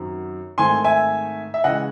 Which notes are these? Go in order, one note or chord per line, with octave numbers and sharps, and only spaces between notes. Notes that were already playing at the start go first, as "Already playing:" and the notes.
Already playing: F#2 D#3 F#3 C4
G#2 D#3 A3 C4 G#5 C6
E5 G#5
E5
C#3 E3 G#3 D#5 F#5